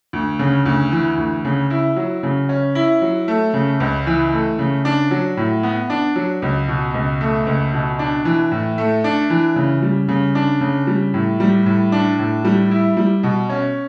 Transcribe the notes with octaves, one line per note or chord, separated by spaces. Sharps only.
D2
C#3
D2
E3
D2
C#3
E4
F#3
C#3
C#4
E4
F#3
A3
C#3
C#2
E3
A3
C#3
D4
F#3
A2
B3
D4
F#3
C#2
B2
C#2
A3
C#2
B2
D4
E3
A2
A3
D4
E3
C#3
G3
C#3
D4
C#3
G3
A2
G3
A2
D4
A2
G3
E4
G3
B2
C#4